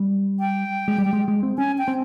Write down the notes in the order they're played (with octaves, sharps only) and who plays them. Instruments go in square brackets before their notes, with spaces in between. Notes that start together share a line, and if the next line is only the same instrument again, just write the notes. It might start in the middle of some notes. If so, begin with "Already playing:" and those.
Already playing: [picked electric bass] G3
[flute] G5
[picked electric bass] G#3
G3
G#3
G#3
C4
[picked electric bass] C#4 [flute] G#5
[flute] G5
[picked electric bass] C4